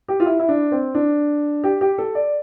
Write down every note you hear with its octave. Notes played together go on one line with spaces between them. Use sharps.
G4
F4
E4
E4
D4
C4
D4
G4
G4
A4
D5